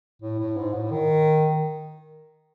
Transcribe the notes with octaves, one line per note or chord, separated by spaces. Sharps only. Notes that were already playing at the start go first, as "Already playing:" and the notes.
A2
A2
G#2
A2
D#3